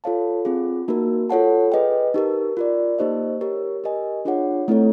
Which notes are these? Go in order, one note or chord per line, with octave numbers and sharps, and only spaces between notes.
F4 A4 C#5 F5 A5
C4 F4 G#4
A#3 D#4 F#4 A#4
F4 A4 C#5 F#5 A5
G#4 B4 D#5 G5
D#4 G4 A#4
F4 A#4 D5
A#3 D#4 G4 C5 D#5
G4 A#4 C#5
G4 A#4 D#5 G#5
D4 F4 G#4 C#5 F#5
A3 C4 E4 A4 C#5